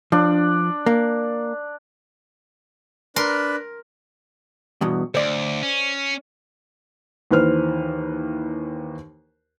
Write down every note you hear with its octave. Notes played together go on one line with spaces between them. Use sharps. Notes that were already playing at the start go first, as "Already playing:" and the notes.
F3 D4
A#3
D4 A#4 B4 C6
E2 G2 B2
D2 C5 D5
C#4
D#2 E3 B4 C5 F6